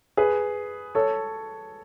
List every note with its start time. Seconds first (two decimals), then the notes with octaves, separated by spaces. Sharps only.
0.17 G#4 B4
0.95 A4 C#5